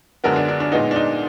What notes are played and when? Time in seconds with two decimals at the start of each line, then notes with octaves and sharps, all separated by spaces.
0.24 F#2 D3 G#3 B3 F#4 A#4
0.36 D4
0.48 D4
0.60 D4
0.72 A#2 G#3 B3 D#4
0.91 D4
0.96 D#4